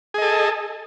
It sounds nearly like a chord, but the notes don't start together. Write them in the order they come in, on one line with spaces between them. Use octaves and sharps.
G#4 D#5 A4